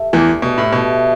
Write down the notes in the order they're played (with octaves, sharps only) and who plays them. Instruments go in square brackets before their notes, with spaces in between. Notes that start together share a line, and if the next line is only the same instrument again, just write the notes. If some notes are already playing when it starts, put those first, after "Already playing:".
Already playing: [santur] A3 G4 A4
[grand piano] E2 E3 [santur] D4
[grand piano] B2 [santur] G3
[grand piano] A2
[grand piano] B2 [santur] A3